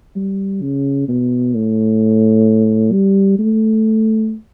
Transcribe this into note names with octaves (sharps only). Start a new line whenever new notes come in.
G3
C#3
B2
A2
G3
A3